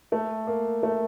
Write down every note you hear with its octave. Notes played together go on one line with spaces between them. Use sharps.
A3
A#3
A3